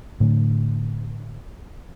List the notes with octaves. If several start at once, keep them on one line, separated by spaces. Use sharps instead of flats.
A2 D3